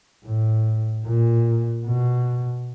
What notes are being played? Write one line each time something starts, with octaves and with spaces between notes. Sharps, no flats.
A2
A#2
B2